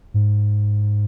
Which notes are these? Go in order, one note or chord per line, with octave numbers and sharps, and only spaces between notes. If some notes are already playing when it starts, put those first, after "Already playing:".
G#2